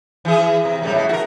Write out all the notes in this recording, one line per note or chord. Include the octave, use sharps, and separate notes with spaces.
E3 G#4
C3
F#2 A2 G3
B2
F#4 A#4